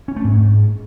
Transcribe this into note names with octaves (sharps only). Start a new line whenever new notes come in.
C#4
A3
G#2